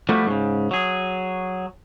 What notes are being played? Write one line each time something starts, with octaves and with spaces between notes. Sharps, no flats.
F3 G3 A3 B3 F#4
G#2 C#3
F#3 G#4